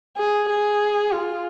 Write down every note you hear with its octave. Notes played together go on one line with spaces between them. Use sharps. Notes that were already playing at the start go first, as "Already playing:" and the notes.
G#4
G#4
F4